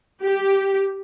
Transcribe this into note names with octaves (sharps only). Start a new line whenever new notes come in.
G4